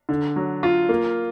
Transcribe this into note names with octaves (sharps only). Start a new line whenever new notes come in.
D3
F#3
F4
A#3